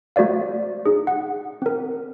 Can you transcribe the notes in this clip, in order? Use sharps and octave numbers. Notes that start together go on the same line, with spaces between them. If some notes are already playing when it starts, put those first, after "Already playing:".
A3 F#4 C5 D5 F5
D#4 G#4
F#5
C4 A#4